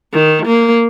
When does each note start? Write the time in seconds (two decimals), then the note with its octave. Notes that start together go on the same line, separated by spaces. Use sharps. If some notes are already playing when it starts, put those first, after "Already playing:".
0.13 D#3
0.46 A#3